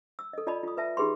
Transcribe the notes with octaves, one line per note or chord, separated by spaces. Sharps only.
E6
A4 D#5
F4 D5 D#5 A5 B5
F4 D#6
B4 E5 A5
D#4 G4 G#4 B4 B5 C6